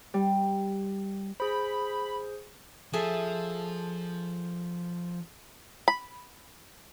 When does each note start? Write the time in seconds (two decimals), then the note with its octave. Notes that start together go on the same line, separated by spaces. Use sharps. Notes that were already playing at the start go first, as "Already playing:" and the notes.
0.14 G3
1.40 G#4 C5 B5
2.93 F3 G#4 A4 E5
5.88 B5